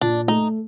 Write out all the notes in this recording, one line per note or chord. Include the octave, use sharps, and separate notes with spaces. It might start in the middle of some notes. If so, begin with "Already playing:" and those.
A#2 D4
A3 D#4